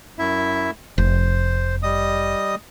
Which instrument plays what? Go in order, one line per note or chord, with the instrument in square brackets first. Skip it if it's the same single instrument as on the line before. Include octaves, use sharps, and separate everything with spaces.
[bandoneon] F#2 E4 E5
[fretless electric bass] F1 [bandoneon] C5
[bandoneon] G3 D#5 D#6